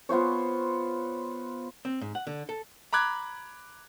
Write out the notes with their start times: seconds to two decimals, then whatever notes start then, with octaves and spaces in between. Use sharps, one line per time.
0.09 B3 F4 C5 C#5
1.85 C4
2.01 G#2
2.15 F#5
2.27 D3
2.49 A4
2.93 A#5 B5 D6 F#6 G#6